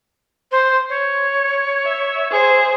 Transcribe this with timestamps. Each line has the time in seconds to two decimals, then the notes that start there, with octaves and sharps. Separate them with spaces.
0.52 C5
0.89 C#5
1.85 E5
2.31 G#4 C5